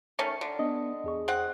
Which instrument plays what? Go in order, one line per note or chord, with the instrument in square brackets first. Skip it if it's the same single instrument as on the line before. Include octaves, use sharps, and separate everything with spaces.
[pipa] D#3 A3 C#4 [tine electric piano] C#7
[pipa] D3
[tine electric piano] B3 D4 [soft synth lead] D#5
[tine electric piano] E2 G#4 C#6
[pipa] C4 F#5